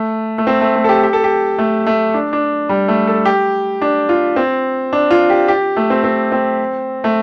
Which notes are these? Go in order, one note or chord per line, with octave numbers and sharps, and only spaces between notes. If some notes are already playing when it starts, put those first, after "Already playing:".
Already playing: A3
A3
C4
A3
A3
A4
G4
G4
A4
G4
A3
A3
D4
D4
G3
A3
A4
G4
D4
F4
C4
D4
F4
G4
G4
A3
C4
C4
C4
A3